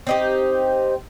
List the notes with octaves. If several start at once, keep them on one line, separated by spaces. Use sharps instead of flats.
C4 D#4 G4